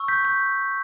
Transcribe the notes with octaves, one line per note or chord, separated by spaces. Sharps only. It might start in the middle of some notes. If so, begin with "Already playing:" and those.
Already playing: C#6 E6
G6 B6
G6